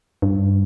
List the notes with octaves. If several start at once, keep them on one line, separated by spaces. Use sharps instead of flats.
G2